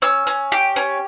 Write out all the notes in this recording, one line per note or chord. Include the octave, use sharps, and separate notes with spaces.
C#4 E6
C#4
G4
C#4